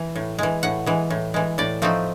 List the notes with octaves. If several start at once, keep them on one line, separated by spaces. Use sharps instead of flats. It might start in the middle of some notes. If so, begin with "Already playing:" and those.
Already playing: E3
A2
E3 G#3
A2 F#5
E3 G#3
A2
E3 G#3
A2 D5
F3 A3 C4 D#4